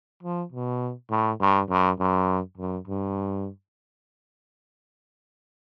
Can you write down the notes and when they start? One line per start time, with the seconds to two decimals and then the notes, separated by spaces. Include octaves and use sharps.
0.23 F3
0.52 B2
1.11 A2
1.41 G2
1.70 F#2
2.00 F#2
2.58 F#2
2.88 G2